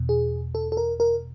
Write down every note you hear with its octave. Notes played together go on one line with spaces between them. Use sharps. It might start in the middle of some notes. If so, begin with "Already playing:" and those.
Already playing: E2 B2
G#4
A4
A4
A#4
A#4